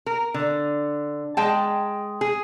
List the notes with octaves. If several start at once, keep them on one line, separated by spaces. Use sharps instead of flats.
A#4
D3
G#3 G5 A5
G#4